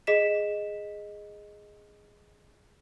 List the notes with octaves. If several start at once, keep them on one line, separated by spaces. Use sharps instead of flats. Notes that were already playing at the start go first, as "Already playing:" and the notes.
G#4 D#5 B6 E7